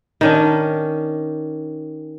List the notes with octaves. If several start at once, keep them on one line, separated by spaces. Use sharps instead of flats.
D#3 C#4 D4